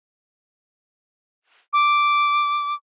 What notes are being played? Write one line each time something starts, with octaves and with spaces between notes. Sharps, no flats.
D6